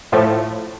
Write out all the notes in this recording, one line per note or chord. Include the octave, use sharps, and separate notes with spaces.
A2 F3 A3